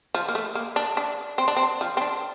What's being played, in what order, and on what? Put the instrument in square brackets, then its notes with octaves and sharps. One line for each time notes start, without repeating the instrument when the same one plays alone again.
[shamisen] F3
A#3
A3
A#3
D4
D4
C4
D4
C4
F3
C4
D4